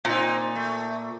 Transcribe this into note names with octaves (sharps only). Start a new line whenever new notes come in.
A#2 C4 D#4
A3